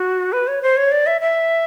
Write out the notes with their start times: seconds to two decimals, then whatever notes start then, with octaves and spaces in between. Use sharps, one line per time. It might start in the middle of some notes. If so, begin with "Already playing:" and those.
Already playing: F#4
0.33 B4
0.48 C#5
0.62 C5
0.77 C#5
0.92 D5
1.07 E5
1.21 E5